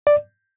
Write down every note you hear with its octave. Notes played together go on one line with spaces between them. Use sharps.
D5